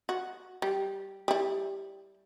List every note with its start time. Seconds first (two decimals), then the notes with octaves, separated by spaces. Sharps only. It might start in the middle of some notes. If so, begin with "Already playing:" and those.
0.09 F#4
0.62 G3
1.28 G3 E4